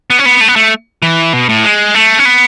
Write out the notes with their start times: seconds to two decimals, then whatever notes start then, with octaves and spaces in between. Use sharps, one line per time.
0.10 B3
0.19 C#4
0.26 B3
0.41 A3
0.48 B3
0.56 A3
1.02 E3
1.33 B2
1.49 A2
1.64 G#3
1.94 A3
2.19 C#4
2.25 B3